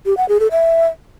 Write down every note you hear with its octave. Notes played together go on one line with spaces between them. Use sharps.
G4
F#5
G#4
A4
E5